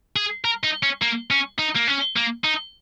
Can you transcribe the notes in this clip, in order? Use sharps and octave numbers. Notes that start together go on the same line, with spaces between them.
G#4
A#4
D#4
C#4
A#3
C#4
D#4
A#3
C#4
A#3
D#4